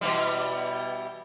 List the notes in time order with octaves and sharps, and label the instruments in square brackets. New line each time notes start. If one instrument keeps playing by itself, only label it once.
[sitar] B2 E3 G3